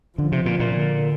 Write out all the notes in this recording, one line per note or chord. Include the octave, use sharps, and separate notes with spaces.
D3 F3
C3
A#2
A#2
D3